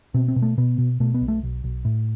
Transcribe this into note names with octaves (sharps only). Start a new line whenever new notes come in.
B2 C4
C4
B2
A3
B2 B3
B2
B2 A3
B3
B1
A3
B1
B1
A2